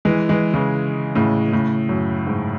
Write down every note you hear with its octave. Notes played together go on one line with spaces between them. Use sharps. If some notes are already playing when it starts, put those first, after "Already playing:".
E3 G#3
E3 G#3
C#3 E3
A2 C#3
A2 C#3
F#2
G#2